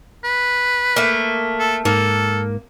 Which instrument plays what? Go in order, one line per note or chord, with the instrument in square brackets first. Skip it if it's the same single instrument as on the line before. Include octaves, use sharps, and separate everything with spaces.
[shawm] B4
[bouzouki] A3 A#3
[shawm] A4
[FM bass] G#2 [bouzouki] A#3 [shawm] A4